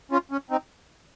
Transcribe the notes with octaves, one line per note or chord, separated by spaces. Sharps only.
C#4 F4
C#4
C4 D#4